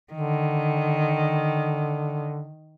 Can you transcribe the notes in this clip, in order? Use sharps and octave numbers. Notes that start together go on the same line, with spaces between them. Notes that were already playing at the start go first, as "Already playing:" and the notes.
D3 D#3